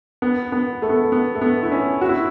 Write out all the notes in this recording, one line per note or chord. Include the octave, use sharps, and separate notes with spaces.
B3
B3
A3
B3
A3
B3
A3
B3
E4
C#4
F#4
E4